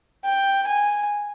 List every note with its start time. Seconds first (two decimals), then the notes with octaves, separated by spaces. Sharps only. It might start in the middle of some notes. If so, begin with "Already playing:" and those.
0.24 G5
0.67 G#5